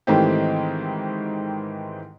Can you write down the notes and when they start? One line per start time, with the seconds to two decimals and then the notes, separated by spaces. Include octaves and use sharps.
0.07 G#2 D#3 E3 A3 C4 G4